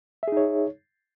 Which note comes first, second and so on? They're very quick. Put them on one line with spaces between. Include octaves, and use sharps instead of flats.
E5 G#4 D#4 C#5